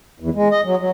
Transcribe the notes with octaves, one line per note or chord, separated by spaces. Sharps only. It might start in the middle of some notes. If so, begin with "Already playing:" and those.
E2
G#3
D#5
F#3
F#3